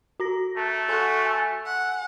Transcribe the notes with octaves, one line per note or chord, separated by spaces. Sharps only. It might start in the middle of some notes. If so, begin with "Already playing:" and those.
F#4 A#5 A#6
A3 A5 F#6
F#4 A4 G#5 C6
G#5 E6
F#5